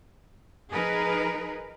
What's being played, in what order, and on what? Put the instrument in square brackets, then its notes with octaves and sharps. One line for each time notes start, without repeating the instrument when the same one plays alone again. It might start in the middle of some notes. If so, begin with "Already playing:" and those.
[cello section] F3 D#4 G#4 A#4 B4